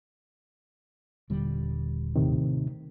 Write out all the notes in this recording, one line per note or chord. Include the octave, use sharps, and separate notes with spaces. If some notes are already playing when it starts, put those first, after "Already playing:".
D#1 D3 G3
A2 C3 D#3